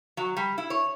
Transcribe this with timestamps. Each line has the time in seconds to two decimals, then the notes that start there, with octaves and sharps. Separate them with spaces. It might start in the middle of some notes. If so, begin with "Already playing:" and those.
0.17 F#3
0.37 G3
0.58 E4
0.70 C#5